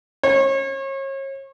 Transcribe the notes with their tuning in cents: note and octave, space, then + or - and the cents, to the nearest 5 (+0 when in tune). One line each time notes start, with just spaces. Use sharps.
C#5 -35